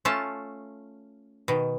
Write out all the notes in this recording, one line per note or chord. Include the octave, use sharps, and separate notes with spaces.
A3 C#4 F4 A5
B2 D#3